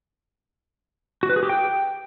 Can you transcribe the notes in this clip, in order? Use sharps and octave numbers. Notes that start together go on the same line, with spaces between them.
F#4
B4
G#4
G4
G5